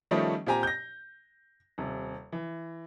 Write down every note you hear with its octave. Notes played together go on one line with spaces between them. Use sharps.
D#3 F3 G3 A3 C#4 D#4
A#2 C4 G4 G#5 A#5
G6 A#6
D#1 C3
E3